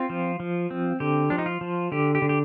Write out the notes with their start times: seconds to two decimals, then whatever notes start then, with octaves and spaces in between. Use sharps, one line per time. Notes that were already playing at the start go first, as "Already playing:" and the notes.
Already playing: C4 F4
0.10 F3
0.40 F3
0.71 C4
1.00 D3 G4
1.30 F3 D4
1.38 D#4
1.46 F4
1.61 F3
1.92 D3 G4
2.15 G4
2.22 D3
2.29 G4